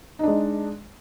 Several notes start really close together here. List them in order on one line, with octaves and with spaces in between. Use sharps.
D#4 D4 G#3